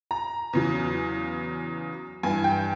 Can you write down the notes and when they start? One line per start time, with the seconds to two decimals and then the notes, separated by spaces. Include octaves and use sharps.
0.11 A#5
0.53 E2 C#3 F#3
2.23 G2 E3 G#5
2.44 G5